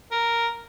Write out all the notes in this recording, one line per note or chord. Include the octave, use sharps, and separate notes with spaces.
A#4